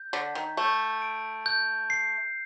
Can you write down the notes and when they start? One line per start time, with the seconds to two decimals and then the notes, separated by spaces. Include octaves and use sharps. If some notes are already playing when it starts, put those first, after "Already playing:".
Already playing: G6
0.13 D3 B6
0.35 D#3
0.57 A3 G6
1.02 D7
1.46 G6
1.90 C7